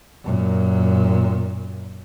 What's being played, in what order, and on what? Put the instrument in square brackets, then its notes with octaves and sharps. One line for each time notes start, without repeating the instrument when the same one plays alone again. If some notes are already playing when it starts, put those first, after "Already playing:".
[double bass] F#2 A#2